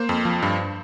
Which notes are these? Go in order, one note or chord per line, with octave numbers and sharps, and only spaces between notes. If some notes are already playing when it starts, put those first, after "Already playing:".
Already playing: A#3 C5
F2
F3
G2